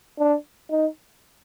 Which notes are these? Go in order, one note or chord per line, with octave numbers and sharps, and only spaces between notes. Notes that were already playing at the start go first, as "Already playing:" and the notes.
D4
D#4